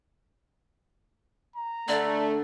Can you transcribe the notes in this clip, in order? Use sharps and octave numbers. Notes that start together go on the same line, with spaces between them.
A#5
D3 A3 D5